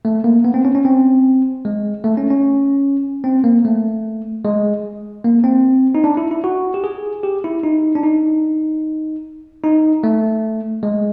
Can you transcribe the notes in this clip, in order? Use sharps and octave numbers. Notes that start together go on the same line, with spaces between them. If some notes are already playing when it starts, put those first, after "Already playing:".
A3
A#3
B3
C4
C#4
C#4
C4
G#3
A3
C#4
C#4
C4
A#3
A3
G#3
A#3
C4
D#4
D4
E4
E4
F#4
G4
G#4
G4
E4
D#4
D4
D#4
D#4
A3
G#3